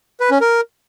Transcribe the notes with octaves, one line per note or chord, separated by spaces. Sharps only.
B4
C#4
A#4